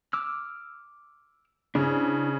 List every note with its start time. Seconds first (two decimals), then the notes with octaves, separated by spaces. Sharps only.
0.13 D6 E6 F6
1.75 C#3 D4 E4 C5